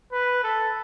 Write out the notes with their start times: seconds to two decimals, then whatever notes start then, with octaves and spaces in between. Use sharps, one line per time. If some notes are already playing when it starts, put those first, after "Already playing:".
0.13 B4
0.43 A4